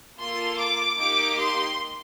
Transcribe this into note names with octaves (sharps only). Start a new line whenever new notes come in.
A#3 F4 A4 C6
D6
A#3 D#4 G4 D6
C6